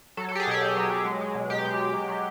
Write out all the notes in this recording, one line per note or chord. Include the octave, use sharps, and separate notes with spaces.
F#3 A4
A4
F#3 G4
G#4
B2 G4
B2
F#3
F#3
G#3
G#3
B2
B2 G4
G#3
G#3
F#3
F#3